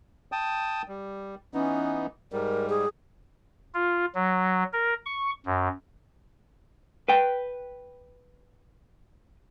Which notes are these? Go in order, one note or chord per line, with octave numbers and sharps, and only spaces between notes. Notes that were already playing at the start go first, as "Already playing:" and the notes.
G5 A5 D#6
G3
E3 B3 C#4 D#4
G#2 G3 A#4
G#4
F4
F#3
A#4
C#6
F#2
B4 G5